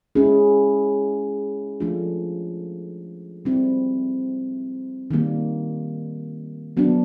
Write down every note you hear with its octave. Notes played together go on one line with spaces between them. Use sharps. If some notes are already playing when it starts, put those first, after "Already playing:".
G#3 C#4 E4 G#4
F3 A3 D4 F4
G3 C4 E4
D#3 G3 A#3
F#3 B3 D4